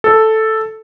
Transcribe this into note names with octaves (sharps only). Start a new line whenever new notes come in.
A4